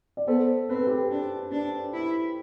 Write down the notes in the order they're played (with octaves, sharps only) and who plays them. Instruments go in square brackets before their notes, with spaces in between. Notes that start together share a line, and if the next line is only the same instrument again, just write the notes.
[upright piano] D5
[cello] B3 [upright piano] A4 C5
[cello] C4 [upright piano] B4
[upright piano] A4
G4 B4
[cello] D4
D4
E4